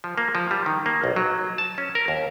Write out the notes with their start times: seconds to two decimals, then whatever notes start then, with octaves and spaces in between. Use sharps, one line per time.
0.04 F3
0.18 A#3
0.35 F3
0.51 G3
0.66 D#3
0.86 A#3
1.04 B1
1.16 F#3
1.58 A5
1.78 C#4
1.95 A#4
2.08 D#2